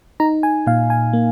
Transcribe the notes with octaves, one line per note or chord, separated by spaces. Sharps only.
D#4 A#5
G#5
A#2 F5
G#5
A#3